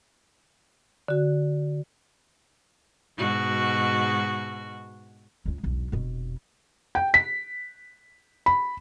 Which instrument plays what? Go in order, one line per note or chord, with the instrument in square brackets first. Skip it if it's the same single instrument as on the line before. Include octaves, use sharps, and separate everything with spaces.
[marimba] D3 F#4
[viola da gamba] G#2 B2 F#4
[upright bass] C#2 G#3
E1 B1
F1 B2
[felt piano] G5
B6
B5